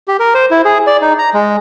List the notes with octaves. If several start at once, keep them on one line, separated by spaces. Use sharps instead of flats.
G4
A#4
C5
E4
G#4
D5
D#4
A#5
G#3